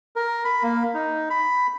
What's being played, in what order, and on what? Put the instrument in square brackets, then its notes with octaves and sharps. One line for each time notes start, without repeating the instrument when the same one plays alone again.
[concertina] A#4
B5
A#3
D#4
B5